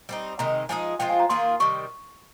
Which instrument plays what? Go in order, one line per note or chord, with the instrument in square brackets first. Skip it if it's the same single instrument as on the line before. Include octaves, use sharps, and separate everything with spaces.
[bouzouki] G3 C4 D#4
[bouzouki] C3 D#3 G#3 D#4 [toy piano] A#5
[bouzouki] F3 G#3 D#4 G#4 [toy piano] G#5
[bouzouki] F3 G#3 C4 F4 [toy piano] G5
[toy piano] G#5
A#5
[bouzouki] D#3 A#3 F4 G#4 [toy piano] C6
[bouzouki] C3 D#3 G3 [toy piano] C#6